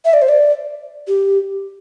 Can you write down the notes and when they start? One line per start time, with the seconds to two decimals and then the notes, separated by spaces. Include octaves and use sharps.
0.05 E5
0.14 D5
0.22 C5
0.29 D5
1.08 G4